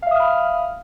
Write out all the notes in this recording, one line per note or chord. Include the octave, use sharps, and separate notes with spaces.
E5 F5 B5 D#6 F6